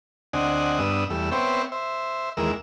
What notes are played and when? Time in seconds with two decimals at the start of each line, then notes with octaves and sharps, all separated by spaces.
0.33 D2 C4 D4 D#5 F#5 G#5
0.79 G2 B3 D4 D#6 E6
1.10 E2 G3 A3 E6
1.32 B3 C4 C5 C#5 E5 G5
1.72 C5 E5
2.37 D#2 E3 G#3 A#4 E6